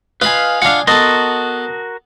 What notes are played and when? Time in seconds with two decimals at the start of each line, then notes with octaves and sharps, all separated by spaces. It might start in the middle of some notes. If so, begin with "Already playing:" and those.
0.21 F4 B4 D#5 F5 G#5 B5
0.62 D4 F4 F5 F#5
0.87 B3 F#4 A4 A#4 D#5 A5 C6